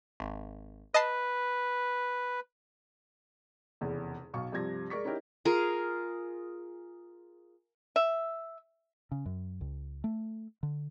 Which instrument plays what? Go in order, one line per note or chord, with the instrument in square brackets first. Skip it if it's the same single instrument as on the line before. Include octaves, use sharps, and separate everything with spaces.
[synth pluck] G#1
[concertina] B4 [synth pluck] D#5 A5 C7
[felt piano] F1 E2 C#3
B1 F5 C#6
G2 C3 F3 G#6 A#6
G#3 A#4 D5 C#6 B6
C#4 D#4 E4 G4 A#4
[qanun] F4 G#4 A#4
[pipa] E5
[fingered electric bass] C#3
F#2
C#2
A3
D3